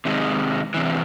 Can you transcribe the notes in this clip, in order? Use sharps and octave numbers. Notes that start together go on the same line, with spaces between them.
C3 D#3 G#3
E2 C3 E3